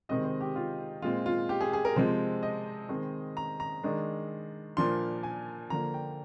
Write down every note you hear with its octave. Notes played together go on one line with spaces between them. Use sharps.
C3 D#3 G#3 C4 D#5
C5
G4
F4
A#2 G#3 C4 F4
F4
G4
G#4
G#4
A#4
C3 F3 G#3 C4 C5
D#5
D#3 G#3 C4
A#5
A#5
D#3 G#3 D4
A#2 F3 A#3 D4 C6
G#5
D3 F3 A#3 A#5
G5